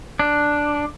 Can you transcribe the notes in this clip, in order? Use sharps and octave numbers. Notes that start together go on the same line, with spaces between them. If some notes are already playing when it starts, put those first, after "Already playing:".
D4